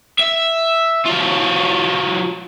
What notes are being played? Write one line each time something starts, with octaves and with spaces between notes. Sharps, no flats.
E5
F#3 F4